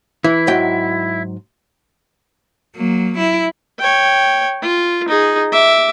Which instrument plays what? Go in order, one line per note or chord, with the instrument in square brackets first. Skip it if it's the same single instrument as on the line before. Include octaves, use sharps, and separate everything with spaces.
[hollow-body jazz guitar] E3 [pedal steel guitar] E4
[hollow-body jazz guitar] G#2 F#3 G5
[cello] F#3 A#3
E4
[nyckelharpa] C#5 G5
F4
D#4 G#4
E5 D6